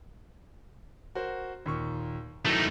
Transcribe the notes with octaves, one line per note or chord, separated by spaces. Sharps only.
F#4 A#4 C5
D#2 A#2 C#6
D#3 E3 F#3 A3 D#4